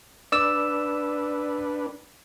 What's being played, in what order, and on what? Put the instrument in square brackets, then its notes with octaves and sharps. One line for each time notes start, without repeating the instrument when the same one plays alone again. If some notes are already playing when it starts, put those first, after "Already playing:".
[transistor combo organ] D4 B4 [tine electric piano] D5 D6 E6